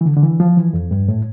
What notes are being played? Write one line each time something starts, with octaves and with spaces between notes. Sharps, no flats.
E3
D3
D3
E3
F3
E3
F2
G2
A2